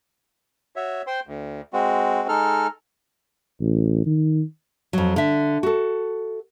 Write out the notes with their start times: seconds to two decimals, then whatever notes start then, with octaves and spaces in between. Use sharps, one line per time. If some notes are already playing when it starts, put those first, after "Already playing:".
0.76 F#4 C#5 E5
1.07 C5 G5 C6
1.27 D2
1.73 G#3 C4 F#4
2.29 G#3 D#4 A4 F6
3.61 A1
4.06 D#3
4.93 F2 F#3
5.16 D3 E5
5.63 F#4 A4